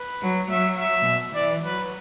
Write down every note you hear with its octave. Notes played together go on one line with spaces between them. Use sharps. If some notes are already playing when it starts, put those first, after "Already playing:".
Already playing: B4
F#3
F#3 E5
E5
B2
E3 D5
F#3 B4